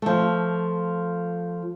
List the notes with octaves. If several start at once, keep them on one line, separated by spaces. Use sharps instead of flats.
F3 A3